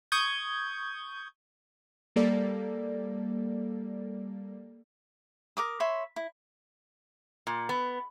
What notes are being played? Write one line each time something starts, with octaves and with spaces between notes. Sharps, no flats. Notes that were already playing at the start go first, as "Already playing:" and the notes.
C#6 D#6 G6 G#6
G3 A#3 A4 D5
A#4 D6 D#6
C#5 E5 B5 C6
E4
A#2
B3